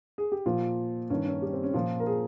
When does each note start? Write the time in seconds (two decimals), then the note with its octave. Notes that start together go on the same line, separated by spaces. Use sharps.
0.18 G#4
0.32 G4
0.46 A#2 F3 F4
1.10 G2 D#3 C#4
1.26 C#4
1.42 G3
1.53 C4
1.63 C#4
1.74 A#2 F3 F4
2.00 A#4
2.07 G#4